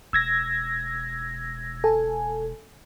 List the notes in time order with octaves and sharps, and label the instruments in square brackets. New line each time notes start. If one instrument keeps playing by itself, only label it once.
[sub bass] E1 [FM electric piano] E6 G#6 A#6
[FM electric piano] A4 G#5